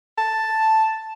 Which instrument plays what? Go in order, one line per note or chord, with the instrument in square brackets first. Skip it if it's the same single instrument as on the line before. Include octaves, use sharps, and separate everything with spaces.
[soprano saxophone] A5